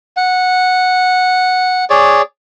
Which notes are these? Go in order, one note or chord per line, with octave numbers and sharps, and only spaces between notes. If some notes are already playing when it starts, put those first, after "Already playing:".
F#5
G#4 C#5 D5